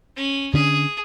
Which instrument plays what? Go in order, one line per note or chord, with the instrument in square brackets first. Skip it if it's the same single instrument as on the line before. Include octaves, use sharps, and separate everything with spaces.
[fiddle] C#4
[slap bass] D3 C#4 D4 [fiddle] G#4